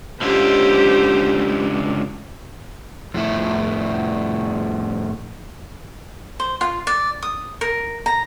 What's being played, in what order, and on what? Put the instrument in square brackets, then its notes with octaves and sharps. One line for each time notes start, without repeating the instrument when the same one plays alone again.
[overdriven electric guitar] C#2 D3 [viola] G4 C5
[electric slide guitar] F2 A2 E4
[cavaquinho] C5
F4
D5
D#6
A#4
A#5